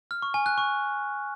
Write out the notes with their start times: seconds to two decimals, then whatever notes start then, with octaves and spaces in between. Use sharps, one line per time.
0.11 F6
0.22 C#6
0.34 G#5
0.46 F#6
0.58 C#6